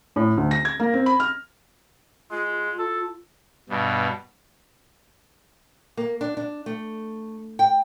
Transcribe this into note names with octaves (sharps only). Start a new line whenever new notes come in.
A2
D2
A#6
G#6
A#3
C4
B5
F6
G#3 F4
A4
G2 B2
A#3
D4
D4
A3
G5